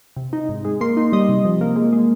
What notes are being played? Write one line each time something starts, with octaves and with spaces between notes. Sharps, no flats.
C3
D#4
G#2
G#3
A#3 C6
D#4
G3 D#5
C3
F3
A#3
G#3
G#3